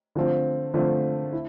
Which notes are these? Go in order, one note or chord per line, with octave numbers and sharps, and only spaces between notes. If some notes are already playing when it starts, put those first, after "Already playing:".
D3 F3 A3 C4 F4
D3 F3 A3 C4 F4
E4